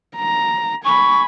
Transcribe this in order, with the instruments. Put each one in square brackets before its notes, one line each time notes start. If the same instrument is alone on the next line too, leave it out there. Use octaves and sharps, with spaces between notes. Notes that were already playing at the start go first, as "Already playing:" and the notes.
[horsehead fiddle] A#5
[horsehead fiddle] G#5 B5 [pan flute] C#6